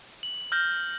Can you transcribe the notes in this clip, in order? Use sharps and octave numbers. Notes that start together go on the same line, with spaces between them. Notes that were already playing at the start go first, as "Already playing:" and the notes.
F#7
F6 G6 A#6